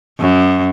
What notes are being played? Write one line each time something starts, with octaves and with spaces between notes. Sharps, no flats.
F#2